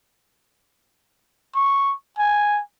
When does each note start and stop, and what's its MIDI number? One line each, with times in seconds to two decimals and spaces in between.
1.55 1.94 85
2.18 2.61 80